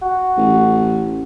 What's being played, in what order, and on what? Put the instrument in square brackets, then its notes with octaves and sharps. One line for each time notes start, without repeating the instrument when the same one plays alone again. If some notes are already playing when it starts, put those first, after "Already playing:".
[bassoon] F#4
[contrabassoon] A1